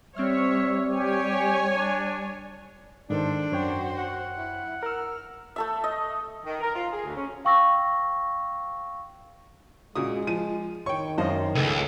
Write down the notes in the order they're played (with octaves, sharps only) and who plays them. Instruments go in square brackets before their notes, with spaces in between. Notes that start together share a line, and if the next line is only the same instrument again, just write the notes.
[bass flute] G3 [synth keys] C4 C5 F6 [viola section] C#5 [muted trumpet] E5
[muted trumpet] G4 [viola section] C#5 G#5
[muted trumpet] D4 [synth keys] D#7
[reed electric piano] G#2 D#3 [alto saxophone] D4 [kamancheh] A4 C5
[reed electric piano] F#2 C#5 G5 [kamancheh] F#4 C5
[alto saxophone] F#5
[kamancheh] E4
[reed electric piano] A#4 E6 [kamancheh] F6
[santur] A3 A4 E5
D#5
[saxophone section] D#3
A#4
F4
G#4
D2
C#4
[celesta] F5 G5 C#6 E6 A#6
[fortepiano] A#2 C#3 D#6 [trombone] G#3 [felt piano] F#4
[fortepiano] F3 [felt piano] D#7
[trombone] D#3 [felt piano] C#5 [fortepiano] G5 C#6
[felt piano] F#2 [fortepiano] C5 D#5 F5
[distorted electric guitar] C#2 [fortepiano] A3 [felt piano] D#7